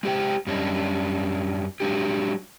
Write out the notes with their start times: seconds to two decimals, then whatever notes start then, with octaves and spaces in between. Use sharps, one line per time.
0.03 G#3 G4 C5 G5
0.47 F#2 G3 C#4 D4 D#5
1.80 F#3 G#3 D4 G4